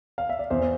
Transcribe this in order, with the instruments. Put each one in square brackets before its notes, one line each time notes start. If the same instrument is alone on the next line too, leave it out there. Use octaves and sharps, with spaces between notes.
[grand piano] F5
E5
D5
E2 C5